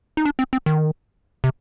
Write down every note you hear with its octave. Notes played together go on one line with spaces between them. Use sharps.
D#4
D4
C4
C4
D#3
C3